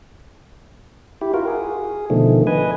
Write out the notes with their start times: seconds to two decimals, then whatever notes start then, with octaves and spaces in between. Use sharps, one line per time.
1.21 E4 G4
1.34 F4 F#4 A#4
1.47 G#4
2.10 B2 D3 D#3 F3 A3
2.47 B4 D#5 G#5